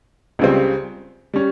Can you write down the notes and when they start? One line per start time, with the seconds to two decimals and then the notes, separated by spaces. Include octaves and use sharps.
0.39 C#2 C#3 G3 C4
1.34 G3 C#4